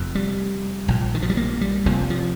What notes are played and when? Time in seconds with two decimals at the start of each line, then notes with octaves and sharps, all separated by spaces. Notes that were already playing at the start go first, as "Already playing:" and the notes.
Already playing: F1 F2
0.15 G3
0.88 A#1 A#2
1.14 D#3
1.22 F3
1.30 G3
1.37 A#3
1.61 G3
1.86 F1 F2 C3 F3
2.10 F3